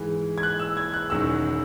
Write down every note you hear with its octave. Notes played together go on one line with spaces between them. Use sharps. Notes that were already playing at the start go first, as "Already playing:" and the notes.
Already playing: G#2 E3 G#3
G#6
F#6
E6
G#6
F#6
E1 E2 D#3 F#3 C#4 E6